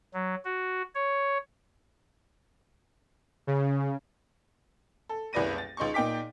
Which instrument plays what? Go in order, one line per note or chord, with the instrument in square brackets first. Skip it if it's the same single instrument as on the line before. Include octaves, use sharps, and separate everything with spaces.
[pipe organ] F#3
F#4
C#5
[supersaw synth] C#3
[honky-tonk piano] A4
F#1 C2 B4 D5 A#6 D#7
A6
C#2 D#4 C6 C#6
A#2 D#4 G5 D6 B6